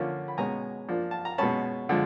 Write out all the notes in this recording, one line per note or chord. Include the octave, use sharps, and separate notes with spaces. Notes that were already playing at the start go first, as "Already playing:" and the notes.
Already playing: D3 F3 A#3 C#4
B5
B2 G#3 C#4 G#5 A#5
F3 A#3 D4
A5
A#5
B2 G#3 C#4 A5 B5
D3 F3 G#3